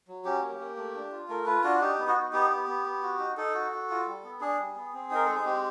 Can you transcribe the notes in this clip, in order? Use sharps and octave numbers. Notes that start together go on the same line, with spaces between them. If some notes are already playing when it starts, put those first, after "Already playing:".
F#3
C#4 G4
A#3
A#3
A3
D4
F4
A3 A#4
F4 B4
D4 F#4
D#4 G4
B3
F#4
D#4
B3 G4
B3
B3
B3
F#4
D#4
D#4 A4
F#4
F#4
F4
G3
B3
D4 G#4
G3
B3
C4
D#4 A#4
G#3 A4
G#4
C4 G4